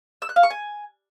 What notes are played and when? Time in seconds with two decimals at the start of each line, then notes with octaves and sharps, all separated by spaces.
0.22 E6
0.29 F#6
0.36 F5
0.43 C#6
0.50 G#5